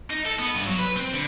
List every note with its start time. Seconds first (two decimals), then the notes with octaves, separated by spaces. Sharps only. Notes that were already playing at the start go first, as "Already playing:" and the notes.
0.10 D#4
0.25 A4
0.39 B3
0.55 G2
0.67 F#3
0.78 B4
0.96 C4
1.13 D3